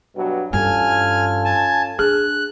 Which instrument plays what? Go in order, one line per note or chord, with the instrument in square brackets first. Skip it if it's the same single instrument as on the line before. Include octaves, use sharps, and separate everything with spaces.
[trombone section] G2 B2 F#3
[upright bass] G2 E3 [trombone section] C#4 F4 A4 [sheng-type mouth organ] G#5 F6
[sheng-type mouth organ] G#5 A5
[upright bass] D4 [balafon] G#4 [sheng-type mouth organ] F#6